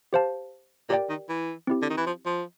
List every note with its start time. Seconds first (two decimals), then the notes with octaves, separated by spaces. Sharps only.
0.13 G4 C5 F5 A5
0.89 A#2 G4 A#4 D5 G5
1.09 D#3
1.29 E3
1.67 C4 E4 G4
1.82 D3
1.90 D#3
1.97 E3
2.06 F3
2.26 F3